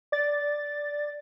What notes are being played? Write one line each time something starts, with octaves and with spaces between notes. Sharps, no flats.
D5 A6